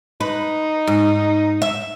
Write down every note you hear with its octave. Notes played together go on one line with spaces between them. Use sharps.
D#4 B4
G#2
E5